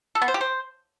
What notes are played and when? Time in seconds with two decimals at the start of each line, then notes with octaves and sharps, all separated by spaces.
0.15 A4
0.22 B3
0.28 C5
0.34 G4
0.41 C5